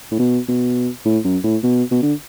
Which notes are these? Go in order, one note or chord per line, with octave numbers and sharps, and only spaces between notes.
A2
B2
B2
A2
F#2
A2
B2
B2
D3